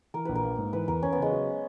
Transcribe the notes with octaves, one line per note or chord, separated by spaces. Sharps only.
E3 A#4
A#1 B4
A#4
A#3
G#2
E3 B4
E2 A#4
E2 C#4
B3
C#3 G#3
F#3